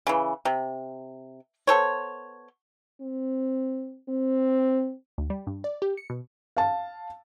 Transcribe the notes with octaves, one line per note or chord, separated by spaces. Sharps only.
C#3 E3
C3
B3 A4 C5 C#5
C4
C4
D2
G3
G2
D5
G4
C#7
B2
F5 A5